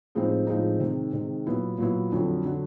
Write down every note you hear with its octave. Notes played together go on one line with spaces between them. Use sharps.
A2 F3 G#3 C4 D#4
A2 F3 G#3 C4 D#4
C3 D#3 G#3
C3 D#3 G#3
A#2 F#3 B3 E4
A#2 F#3 B3 E4
F2 D3 F#3
D3 F#3